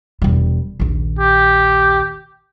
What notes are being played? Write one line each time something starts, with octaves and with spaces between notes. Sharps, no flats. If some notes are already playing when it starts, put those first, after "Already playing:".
E1 G3
A#1 D#2
G4